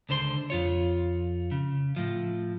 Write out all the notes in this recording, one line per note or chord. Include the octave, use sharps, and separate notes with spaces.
C#2 D3 C5 C6
F2 F4 C#5
C#3
A2 F3